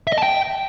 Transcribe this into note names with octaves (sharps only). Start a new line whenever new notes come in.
E5
D#5
A5
G5